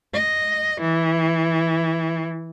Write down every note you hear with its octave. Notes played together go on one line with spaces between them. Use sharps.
D#5
E3